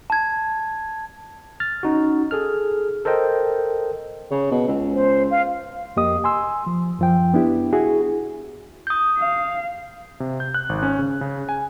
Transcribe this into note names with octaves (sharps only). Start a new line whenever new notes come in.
A5 G#6
F6 A6
C#4 D#4 F#4
G#4 A4 F6
A4 A#4 C5 D#5 G5
C#3
B2
C#2
C5
F5
F2 A#3 G4 D#5 D#6
G#5 C6 E6
F3
F#2 F3 G5
B3 D4 E4 G4
E4 F#4 G#4
D#6 G6
F5
C3
G6
F#6
G#1
C#4
C#3
C#3
G#5